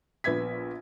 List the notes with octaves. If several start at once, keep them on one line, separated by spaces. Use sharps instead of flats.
A#1 B3 E5 G#6 B6